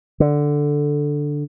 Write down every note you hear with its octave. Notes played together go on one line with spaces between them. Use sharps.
D3